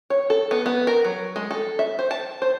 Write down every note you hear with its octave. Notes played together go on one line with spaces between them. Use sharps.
C#5
A4
B3
B3
A#4
F#3
G#3
A4
E5
C5
A5
C5